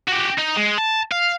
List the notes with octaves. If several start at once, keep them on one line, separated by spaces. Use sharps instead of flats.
F#4 G4
D#4
G#3
A5
F5